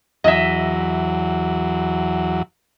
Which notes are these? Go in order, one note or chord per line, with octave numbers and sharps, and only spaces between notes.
E2 F#3 D#5 E5